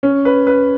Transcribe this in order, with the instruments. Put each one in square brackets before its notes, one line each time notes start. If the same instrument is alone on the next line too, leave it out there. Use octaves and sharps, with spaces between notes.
[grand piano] C#4
B4
B4